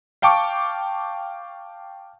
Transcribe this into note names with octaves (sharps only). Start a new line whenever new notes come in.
F5 G5 A5 C#6 D6